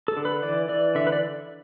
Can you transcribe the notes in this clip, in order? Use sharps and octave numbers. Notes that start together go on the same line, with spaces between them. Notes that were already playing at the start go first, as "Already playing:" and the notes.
A4
D3
B4
E3 D5
E3 D5
D3 E5
B4
D5